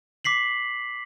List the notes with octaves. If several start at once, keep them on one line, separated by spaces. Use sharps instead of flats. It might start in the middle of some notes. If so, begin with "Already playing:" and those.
D6 B6 C7 F#7